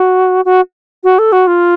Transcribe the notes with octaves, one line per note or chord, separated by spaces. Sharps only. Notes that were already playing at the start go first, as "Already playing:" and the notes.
Already playing: F#4
F#4
F#4
A4
F#4
F4